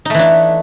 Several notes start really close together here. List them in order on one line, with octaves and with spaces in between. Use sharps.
D#4 A3 E3 D4